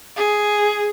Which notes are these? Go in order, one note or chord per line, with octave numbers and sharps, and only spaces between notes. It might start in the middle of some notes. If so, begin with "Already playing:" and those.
G#4